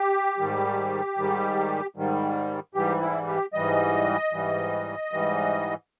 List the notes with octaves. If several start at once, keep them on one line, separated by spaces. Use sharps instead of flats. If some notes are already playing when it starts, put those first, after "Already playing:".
Already playing: G4
G#2 D#3 G3
G#2 D#3 G3
G#2 D#3 G3
G#2 E3 G3 G4
E4
G4
G#2 E3 G3 D#5
G#2 E3 G3
G#2 E3 G3